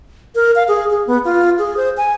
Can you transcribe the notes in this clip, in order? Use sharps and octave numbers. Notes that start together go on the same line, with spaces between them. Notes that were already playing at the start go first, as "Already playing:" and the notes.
A#4
F5
G#4
G#4
B3
F4
G#4
C5
G#5